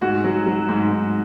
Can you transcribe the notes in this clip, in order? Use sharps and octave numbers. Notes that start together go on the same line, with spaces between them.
G#2 F#4
F#3
F#3
G#2
G#2